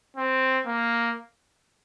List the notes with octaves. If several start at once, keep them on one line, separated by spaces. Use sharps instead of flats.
C4
A#3